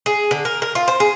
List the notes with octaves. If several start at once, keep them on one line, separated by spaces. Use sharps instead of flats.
G#4
D3
A#4
A#4
F4
C5
G#4